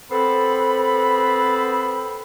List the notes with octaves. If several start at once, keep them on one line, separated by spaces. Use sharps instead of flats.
B3 C4 A4 C5 B5